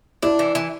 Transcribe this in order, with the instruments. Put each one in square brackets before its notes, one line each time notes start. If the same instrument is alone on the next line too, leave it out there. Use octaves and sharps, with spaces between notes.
[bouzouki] D4 [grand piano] E4
[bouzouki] E3
E3